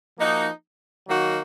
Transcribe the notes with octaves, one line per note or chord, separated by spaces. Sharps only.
F3 A#3 D#4 F#4
D#3 F#3 A#3 D#4 F#4